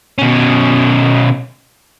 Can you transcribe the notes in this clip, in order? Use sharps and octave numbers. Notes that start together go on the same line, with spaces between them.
B2 C#4